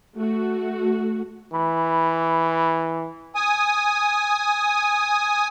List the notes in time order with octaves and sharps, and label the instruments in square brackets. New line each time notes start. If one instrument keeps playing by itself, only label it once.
[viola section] A3 F#4
[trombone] E3 [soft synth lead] B5
[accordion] G#5 D#6